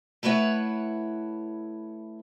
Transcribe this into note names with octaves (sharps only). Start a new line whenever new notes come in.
A3 E4 B4 C#5 F#5